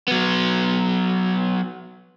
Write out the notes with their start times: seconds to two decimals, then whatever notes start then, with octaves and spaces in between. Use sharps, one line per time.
0.08 F#3 B3